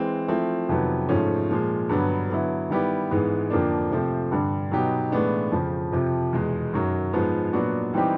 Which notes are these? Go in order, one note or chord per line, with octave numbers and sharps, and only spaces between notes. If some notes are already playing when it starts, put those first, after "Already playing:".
Already playing: E3 G#3 C4
F3 A3 C4 E4
F2 C3 D#3 F#3 B3
G#2 F3 A3 C#4
A#2 F3 G#3
G2 D3 F#3 B3
D3 F#3 B3 E4
D#3 G3 B3 E4 G4
G#2 E3 G#3 B3
F2 D3 F3 A#3 D4
C3 F3 A3 C4
G2 D3 G3
B2 F#3 B3 D#4 G4
A2 E3 G#3 B3 D4
F2 C#3 F3
F2 C3 F3
E2 B2 G#3
F#2 D#3 F#3
G#2 F3 G#3 B3
A#2 F#3 B3 D4 F#4
E3 G3 C4 D#4 G4